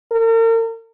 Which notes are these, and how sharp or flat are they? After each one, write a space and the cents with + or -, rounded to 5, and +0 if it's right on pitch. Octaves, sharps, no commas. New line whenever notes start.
A#4 -40